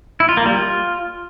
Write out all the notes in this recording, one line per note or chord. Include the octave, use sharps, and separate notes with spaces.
E4
F4
A#3
G3
F4